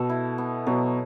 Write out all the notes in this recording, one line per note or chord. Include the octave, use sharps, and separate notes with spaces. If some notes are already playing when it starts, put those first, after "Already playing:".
Already playing: B2 A4
E4
B3
B2 F#3